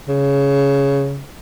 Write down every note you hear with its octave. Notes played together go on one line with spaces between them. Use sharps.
C#3